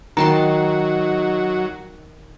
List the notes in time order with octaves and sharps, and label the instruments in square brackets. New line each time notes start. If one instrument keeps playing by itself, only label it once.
[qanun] D#3 A5 C6 [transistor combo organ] F#3 [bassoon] D#4 [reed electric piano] A#5